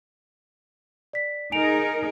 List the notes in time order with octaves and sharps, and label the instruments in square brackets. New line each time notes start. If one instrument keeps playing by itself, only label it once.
[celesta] D5 B6
[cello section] D#4 G#4 A#4 [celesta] G#5 D7 F7